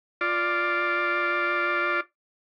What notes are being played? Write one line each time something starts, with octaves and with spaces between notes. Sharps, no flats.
F4 D5